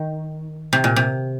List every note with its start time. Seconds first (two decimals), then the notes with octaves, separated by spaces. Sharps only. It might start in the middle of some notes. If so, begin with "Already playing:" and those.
Already playing: D#3
0.73 C3
0.84 A#2
0.96 C3